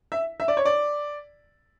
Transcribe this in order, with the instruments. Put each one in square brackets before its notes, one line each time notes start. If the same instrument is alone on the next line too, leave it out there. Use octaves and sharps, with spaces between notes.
[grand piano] E5
E5
D5
C#5
D5